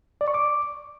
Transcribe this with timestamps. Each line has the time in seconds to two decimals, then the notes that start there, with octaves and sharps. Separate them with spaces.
0.21 D5
0.28 C#6
0.34 D6